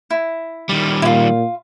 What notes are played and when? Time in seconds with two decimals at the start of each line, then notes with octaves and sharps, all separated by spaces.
0.11 E4
0.69 D#3 G3
1.02 A#2 E4 F4